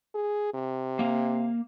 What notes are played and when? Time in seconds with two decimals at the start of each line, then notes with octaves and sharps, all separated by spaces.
0.15 G#4
0.54 C3
0.99 A#3 F5